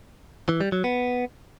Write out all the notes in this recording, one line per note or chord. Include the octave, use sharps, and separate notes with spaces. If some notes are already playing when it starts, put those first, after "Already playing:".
E3
G3
F#3
B3